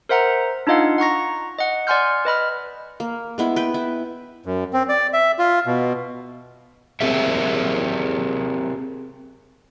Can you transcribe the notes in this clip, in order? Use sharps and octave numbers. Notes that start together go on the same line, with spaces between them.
A#4 C5 E5 F#5 A#5
D4 D#4 F4 D#5 F5 F#5
F#5 A#5 C#6 A#6
D#5 F#5
D5 F#5 G#5 C6 F6 G6
B4 D#5 B5 F6
A#3
G#3 B3 E4
B4 G5
E4
F#2
C4
D5
E5
F4
B2
C4 G4 G#4 A#4 E5